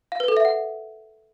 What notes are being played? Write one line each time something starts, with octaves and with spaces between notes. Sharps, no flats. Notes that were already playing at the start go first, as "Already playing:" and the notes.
F5
B4
A4
E5
F#5